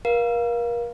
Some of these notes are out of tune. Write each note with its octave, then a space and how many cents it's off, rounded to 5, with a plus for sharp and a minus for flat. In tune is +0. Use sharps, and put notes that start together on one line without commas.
A#4 +35 F5 +0